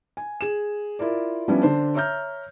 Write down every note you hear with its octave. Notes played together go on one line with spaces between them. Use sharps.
G#5
G#4 E7
E4 F4 A#4 D5
F3 G3 B3 C#4 D4 E4
D3 D4 C5
C#5 E5 A#5 F6 G6